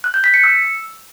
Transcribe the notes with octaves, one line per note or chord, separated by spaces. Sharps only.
F#6
G6
B6
C#7
E6